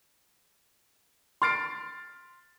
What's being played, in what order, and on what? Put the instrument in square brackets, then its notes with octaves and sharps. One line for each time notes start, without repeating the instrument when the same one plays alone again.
[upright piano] C6 F6 A6 C7 D7